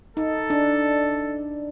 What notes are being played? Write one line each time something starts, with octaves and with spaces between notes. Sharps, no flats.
D#4 A4
D4